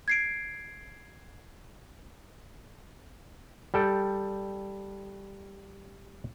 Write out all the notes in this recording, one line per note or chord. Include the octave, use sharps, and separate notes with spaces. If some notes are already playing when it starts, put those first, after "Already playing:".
G#6 C7 D7
G3 A4 G5